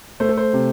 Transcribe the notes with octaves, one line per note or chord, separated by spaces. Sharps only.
A3 C5
A4
C5
C3